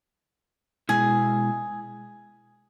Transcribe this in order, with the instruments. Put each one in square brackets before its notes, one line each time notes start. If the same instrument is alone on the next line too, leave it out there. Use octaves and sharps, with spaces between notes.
[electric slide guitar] B2 G#3 E4 [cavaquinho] G#4